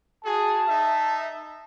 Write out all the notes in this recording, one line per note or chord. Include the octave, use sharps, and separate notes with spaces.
F#4 G#4 A5
D#4 E5